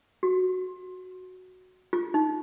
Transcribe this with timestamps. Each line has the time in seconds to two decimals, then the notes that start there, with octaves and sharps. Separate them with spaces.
0.23 F#4
1.93 F4
2.14 D#4